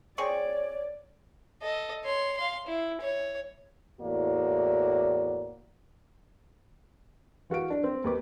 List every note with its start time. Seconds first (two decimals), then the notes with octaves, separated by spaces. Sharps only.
0.18 C4 G#4 C#5 D5 C#6
1.62 A4 D#5
2.04 C#5 C6
2.38 F5 C6
2.67 E4
3.01 C#5
4.01 E2 A2 A#3 F#4 D5
7.50 E3 F#4 F5 D7
7.70 D4
7.83 C4
8.04 D#2 B4 D6